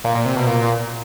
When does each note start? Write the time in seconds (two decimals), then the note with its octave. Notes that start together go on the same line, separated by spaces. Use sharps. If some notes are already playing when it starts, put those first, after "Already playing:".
0.04 A#2
0.15 A#2
0.26 C3
0.36 B2
0.47 A#2